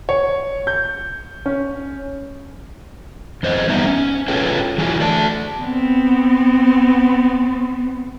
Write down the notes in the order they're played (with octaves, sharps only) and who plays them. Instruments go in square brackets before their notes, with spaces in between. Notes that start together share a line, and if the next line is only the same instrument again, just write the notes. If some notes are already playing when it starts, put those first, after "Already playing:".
[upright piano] C#5
G6
C#4
[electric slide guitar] E2 C5 D#5
G3 B3 D#4 E5 G#5 A#5
C#4
F4 G#4 A4 B4 C#5 G5
E3 F#3 G#4
A3 D5 A5
[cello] B3 C4